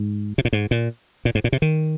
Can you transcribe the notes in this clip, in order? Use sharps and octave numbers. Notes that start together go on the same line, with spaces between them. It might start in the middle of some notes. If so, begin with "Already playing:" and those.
Already playing: G#2
C3
A#2
G#2
A#2
A#2
G#2
A#2
C3
D#3